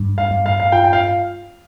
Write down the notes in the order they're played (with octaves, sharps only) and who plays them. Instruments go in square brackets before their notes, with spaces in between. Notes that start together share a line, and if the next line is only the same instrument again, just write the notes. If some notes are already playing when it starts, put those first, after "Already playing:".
Already playing: [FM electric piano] G2
[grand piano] F5
[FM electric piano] G2
[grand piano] F5
F5
[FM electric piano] F4 [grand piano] G5
[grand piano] G5
F5